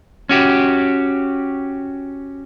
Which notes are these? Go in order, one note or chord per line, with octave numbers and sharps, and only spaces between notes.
C#4 F#4 G4